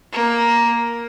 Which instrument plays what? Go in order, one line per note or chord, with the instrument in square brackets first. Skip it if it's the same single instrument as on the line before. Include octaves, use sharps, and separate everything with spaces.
[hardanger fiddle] A#3